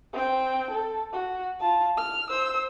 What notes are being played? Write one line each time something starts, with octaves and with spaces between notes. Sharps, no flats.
C4 G5
A4
F#4
F4 A5
F6
C5 E6